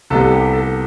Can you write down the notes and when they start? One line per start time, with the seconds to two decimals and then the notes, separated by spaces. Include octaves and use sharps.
0.10 C2 C3 G3 B3 A4
0.21 A4
0.31 G4
0.53 A4